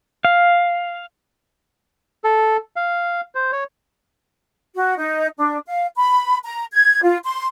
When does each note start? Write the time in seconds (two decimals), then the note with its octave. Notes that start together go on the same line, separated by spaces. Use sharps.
0.25 F5
2.24 A4
2.76 F5
3.35 C5
3.52 C#5
4.75 F#4
4.97 D#4
5.37 D4
5.66 F5
5.96 B5
6.43 A#5
6.72 G#6
7.02 F4
7.24 C6